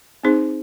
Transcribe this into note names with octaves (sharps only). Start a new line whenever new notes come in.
C4 D#4 G#4 C5